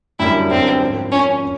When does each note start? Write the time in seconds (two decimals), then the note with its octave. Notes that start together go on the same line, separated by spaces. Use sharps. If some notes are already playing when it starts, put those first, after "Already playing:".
0.19 F#2 D3 G3 A#3 E4
0.51 F#2 D3 G3 A#3 C4
0.81 G#2 F3 A#3
1.12 G#2 F3 A#3 C#4
1.42 C#4